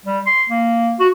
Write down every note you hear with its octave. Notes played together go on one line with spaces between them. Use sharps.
G3
C6
A#3
F#4